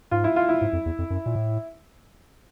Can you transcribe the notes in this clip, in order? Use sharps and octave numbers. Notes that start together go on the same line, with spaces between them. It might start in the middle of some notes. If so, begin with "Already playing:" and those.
G#2 F4
E4
F4
E4
G#2
F2
E2
F2
F#2
A#2
A2